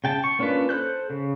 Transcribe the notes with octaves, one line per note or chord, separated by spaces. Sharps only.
C#3 G5 A5
C#6
A#3 C#4 D4 F4 B4
A4 C5 F#6 G6
C#3